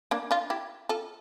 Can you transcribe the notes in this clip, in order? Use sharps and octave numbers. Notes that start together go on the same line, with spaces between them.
A#3 D4
D4 F4
E4 G4
F4 A4